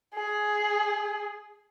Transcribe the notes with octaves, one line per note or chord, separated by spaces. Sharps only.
G#4